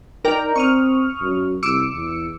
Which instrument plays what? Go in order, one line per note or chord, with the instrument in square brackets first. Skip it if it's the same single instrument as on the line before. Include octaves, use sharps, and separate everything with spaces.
[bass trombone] D#4 [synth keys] A#4 D5 G5
[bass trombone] C4 [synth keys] C#6 D#6 F6
[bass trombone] F#2
[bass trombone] C2 [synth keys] D6 E6 C#7
[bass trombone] E2